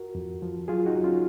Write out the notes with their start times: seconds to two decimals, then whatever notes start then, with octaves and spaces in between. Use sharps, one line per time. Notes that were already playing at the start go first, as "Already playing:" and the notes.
Already playing: F#4 A#4
0.15 F2
0.42 F3
0.68 F#3 F4 G#4
0.86 D#4 F#4
0.96 F#3
1.04 C#4 F4